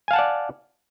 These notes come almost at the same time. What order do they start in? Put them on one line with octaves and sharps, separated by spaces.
G#5 F5 A5 F#5 D5